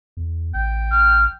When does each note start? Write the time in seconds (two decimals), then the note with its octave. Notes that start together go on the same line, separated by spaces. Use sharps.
0.17 E2
0.54 A1 G5
0.91 F6